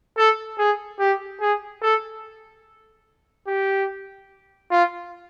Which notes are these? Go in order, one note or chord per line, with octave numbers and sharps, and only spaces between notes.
A4
G#4
G4
G#4
A4
G4
F4